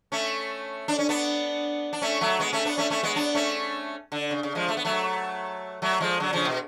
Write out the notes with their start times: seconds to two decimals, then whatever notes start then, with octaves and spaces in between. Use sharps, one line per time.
0.12 A3 C#4
0.88 D4
0.99 C#4
1.09 B3 D4
1.93 D4
2.02 A3 C#4
2.21 F#3 A3
2.40 G#3 B3
2.53 A3 C#4
2.65 B3 D4
2.78 A3 C#4
2.90 A3 C#4
3.03 G#3 B3
3.15 B3 D4
3.35 A3 C#4
4.12 D3
4.31 C#3
4.43 C#3
4.55 F3 G#3
4.69 A3
4.77 B3
4.85 F#3 A3
5.82 F#3 A3
6.01 F3 G#3
6.20 D3 F#3
6.33 C#3 F3
6.45 B2